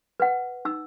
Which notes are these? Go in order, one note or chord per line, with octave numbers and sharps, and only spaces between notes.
B4 F#5
D#4 E6